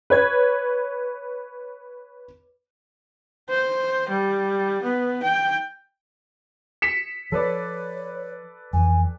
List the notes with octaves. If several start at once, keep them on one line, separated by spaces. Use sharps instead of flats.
B4 C#5 G#6
C5
G3
B3
G5
B6 C#7 E7
F3 A4 B4 C#5 D5
F2 E3 G#5